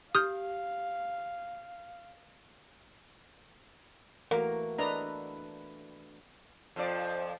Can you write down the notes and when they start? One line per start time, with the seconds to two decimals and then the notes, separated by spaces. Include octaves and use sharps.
0.15 G4 F5 D#6 F6 G6
4.31 E3 A3 A#3 F#4 A#4
4.78 D4 A4 B4 D5 D#5 A#5
6.76 F2 F3 D5